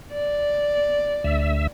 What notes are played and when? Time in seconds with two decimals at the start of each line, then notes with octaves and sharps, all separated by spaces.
0.13 D5
1.24 D2 E5